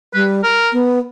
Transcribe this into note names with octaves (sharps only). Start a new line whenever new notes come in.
G3 B4
A#4
B3